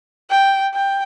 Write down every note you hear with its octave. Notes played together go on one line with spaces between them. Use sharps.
G5
G5